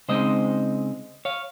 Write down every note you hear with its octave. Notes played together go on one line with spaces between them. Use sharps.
C#3 G#3 C4 D#4 C5 D#5
C#5 F5